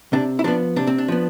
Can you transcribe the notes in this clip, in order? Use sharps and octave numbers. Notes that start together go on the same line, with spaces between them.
C3 D4
E4
F3 B3 D4
C3 D4
C4
D4
F3 B3